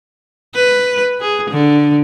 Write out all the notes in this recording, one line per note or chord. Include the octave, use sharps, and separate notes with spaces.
B4
G#4
D3